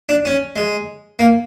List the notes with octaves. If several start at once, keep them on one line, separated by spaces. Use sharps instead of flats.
D4
C#4
G#3
A#3